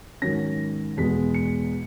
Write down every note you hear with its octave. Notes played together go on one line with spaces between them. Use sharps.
G#2 D#3 F#3 C#4 A#6
E2 B2 G#3 B3 B6
C#7